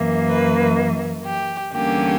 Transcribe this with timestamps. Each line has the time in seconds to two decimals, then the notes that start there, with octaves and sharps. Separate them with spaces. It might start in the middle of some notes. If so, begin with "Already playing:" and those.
Already playing: F#2 E3 A#3
0.27 B4
1.25 G4
1.72 E2 D3 G3 A#3 C#4 G4